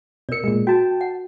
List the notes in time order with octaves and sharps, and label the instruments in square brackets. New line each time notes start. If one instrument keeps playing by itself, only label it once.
[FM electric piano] B2 C#7 [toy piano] A#4 D5
[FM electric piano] A#2 G#3
[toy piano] F#4 [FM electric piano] G5 A5
[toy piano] F#5